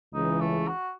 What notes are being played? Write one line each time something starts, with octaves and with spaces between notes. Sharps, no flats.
C#2 C#3 E3 D#4
A3
F#4